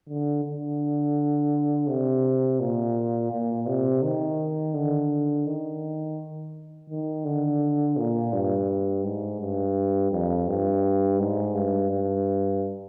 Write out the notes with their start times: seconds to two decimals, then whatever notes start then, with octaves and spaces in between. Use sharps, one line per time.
0.09 D3
0.45 D3
1.87 C3
2.60 A#2
3.31 A#2
3.67 C3
4.03 D#3
4.74 D3
5.46 D#3
6.90 D#3
7.25 D3
7.97 A#2
8.33 G2
9.04 G#2
9.40 G2
10.11 F2
10.47 G2
11.19 G#2
11.54 G2
11.91 G2